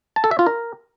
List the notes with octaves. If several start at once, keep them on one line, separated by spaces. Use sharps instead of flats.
A5
A4
E5
F4
A#4